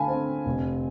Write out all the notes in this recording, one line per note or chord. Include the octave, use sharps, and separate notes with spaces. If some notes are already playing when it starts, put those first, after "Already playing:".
Already playing: D3 A3 F5 G#5 A5 B5
C4
F1